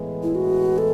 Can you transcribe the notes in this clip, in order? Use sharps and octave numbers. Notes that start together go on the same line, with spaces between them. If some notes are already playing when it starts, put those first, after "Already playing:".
Already playing: A2 E3 G#3 B3
E4
F#4
A4